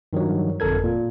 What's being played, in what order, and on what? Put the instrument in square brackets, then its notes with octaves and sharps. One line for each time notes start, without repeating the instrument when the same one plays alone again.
[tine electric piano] G2 D#3 F3 F#3
G1 F2 A4 A#4 G#6
A#2